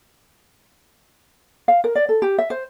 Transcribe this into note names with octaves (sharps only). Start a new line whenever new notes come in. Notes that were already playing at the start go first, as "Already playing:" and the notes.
F5
A#4
D5
A4
G4
E5
C5